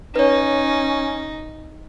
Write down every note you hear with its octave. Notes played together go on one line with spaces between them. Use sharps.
C#4 D#4 B4 C#5